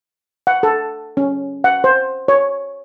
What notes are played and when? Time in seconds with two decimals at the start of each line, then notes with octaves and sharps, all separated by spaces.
0.47 F#5
0.63 A4
1.17 C#4
1.64 F#5
1.84 C5
2.28 C#5